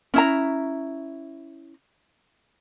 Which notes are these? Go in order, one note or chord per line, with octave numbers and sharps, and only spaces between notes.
C#4 E4 A#5